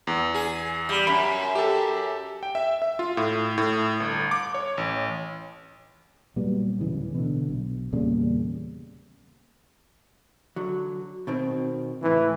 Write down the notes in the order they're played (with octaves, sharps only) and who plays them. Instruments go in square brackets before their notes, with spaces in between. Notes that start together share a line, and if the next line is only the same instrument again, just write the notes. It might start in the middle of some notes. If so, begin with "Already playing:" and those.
[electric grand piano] E2
[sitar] G#4
G3
[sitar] F#2 [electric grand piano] B5
[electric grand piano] G4 A4
G5
E5
E5
F4
A2
A2
G1
D6
C#5
A1
[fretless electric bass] A#2 F#3 G3 B3
D1 C#3 E3
B2 D3
B1
E2 A#2 C#3 G3
[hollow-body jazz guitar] D3 F#3
B2 D#3 C4
[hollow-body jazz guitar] C#2 A2 [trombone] E3